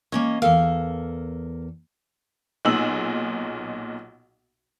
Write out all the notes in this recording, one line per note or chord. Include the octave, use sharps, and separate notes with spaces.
A#3 C#4 C#5 D#5
E2 A4 A#4 F5
B1 A#2 D#4 G#4 E6 F#7